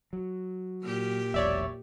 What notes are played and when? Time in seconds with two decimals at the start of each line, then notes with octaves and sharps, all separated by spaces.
0.13 F#3
0.82 A#2 G4
1.34 E1 B1 C#5 D5 E5